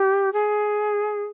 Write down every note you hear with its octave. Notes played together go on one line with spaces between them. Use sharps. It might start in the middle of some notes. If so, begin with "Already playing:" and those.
Already playing: G4
G#4